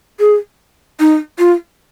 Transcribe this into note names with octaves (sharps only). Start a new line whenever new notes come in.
G#4
D#4
F4